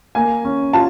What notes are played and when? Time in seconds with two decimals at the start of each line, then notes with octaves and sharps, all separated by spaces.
0.15 A#3 G#5
0.45 C#4
0.73 F4 A5